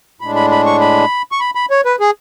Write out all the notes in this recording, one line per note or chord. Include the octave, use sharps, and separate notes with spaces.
A2 G#3 D4 B5
B5
B5
C#6
B5
C#6
B5
B5
C#5
B4
G#4